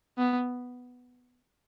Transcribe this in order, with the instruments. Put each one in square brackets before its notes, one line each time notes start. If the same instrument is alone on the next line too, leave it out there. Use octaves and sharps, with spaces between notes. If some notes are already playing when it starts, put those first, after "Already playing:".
[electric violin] B3